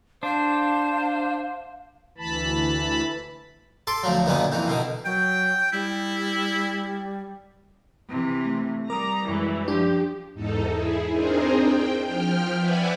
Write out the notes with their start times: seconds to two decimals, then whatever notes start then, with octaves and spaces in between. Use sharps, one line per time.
0.23 D4 C5 F5 A5 G6
2.18 D2 E3 A5 B5
3.87 A4 A5 C6 D6
4.03 D2 F3 F#3
4.26 F#2 A#2 D3 D#3 B3
4.52 F2 D#3 E3
4.68 B2 D3 D#3
5.05 F#3 G5
5.72 G3 E4
8.09 C3 E3
8.46 A3
8.90 G3 A#4 A#5 D6 D#6
9.28 F#2 E3 G#3 C#6
9.68 F3 D4 G4
10.34 E2 G#2 D#4 A4
10.71 E4 G#4
11.12 C4 D4 D#4 G#4 A#4 C5
11.53 G5
12.04 F3 G5 F6
12.58 B4 D5 E5 F#5 G#5 B5